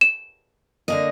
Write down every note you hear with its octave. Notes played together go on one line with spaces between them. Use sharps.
E7
D3 A#3 D#5